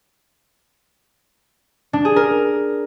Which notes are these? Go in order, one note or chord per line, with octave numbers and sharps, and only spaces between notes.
D4
G#4
A#4